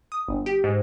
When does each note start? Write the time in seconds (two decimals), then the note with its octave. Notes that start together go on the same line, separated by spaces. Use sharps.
0.12 D#6
0.28 G1
0.46 G4
0.64 G#2